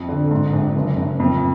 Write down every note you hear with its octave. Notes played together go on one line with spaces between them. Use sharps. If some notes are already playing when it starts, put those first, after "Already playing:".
Already playing: F2
D3
G#2
A#1
F#1
F#1
F2